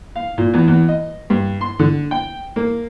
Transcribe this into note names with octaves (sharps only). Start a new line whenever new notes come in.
F5
A#2
E2
E2
D#5
G2
C6
D3
G5
A#3